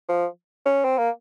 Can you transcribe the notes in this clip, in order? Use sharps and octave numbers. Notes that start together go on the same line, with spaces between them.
F3
C#4
C4
A#3